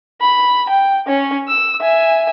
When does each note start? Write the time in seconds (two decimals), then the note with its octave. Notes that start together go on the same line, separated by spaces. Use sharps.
0.21 B5
0.70 G5
1.07 C#4 C#5
1.48 E6
1.81 E5 G#5